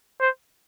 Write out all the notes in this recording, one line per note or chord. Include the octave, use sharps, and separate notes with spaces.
C5